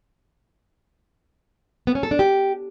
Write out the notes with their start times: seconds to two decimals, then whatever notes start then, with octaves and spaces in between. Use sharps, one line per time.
1.87 B3
1.95 C#4
2.03 A4
2.11 D4
2.19 G4